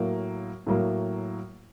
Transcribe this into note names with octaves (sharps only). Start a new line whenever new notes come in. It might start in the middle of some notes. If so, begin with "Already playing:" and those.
Already playing: A2 F#3 A#3
A2 F#3 A#3